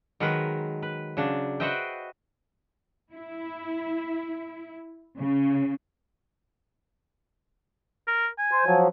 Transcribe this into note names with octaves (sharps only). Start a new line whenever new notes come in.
D#3 F#3 G#3 A#4 B4
B4
C#3 F#3 D4
F#4 B4 C5 D#5 E5 G5
E4
C#3
A#4
G#5
C5
F3 F#3